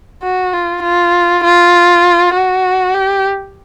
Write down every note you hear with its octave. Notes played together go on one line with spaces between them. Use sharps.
F#4
F4
F4
F4
F#4
G4